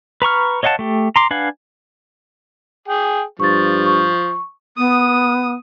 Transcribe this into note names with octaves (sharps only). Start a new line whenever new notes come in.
B4 A#5 C#6 F6
C#5 D#5 F5 F#5 A5
A3 G4
A#5 C6 D6
D4 B4 F5 F#5 G#5
G#4 G5
G2 F3 C#6 A6
C#6
B3 D#6